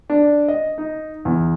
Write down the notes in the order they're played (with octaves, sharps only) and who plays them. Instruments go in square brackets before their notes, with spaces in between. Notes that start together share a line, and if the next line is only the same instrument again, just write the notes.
[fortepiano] D4
D#5
D#4
E2